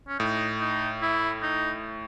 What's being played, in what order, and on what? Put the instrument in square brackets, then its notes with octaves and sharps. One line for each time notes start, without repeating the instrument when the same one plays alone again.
[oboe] C#4
[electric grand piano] A2 [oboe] D#4
[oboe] D#4
E4
D#4